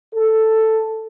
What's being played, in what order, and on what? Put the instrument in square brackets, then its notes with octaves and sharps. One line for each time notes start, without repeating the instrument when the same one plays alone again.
[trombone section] A4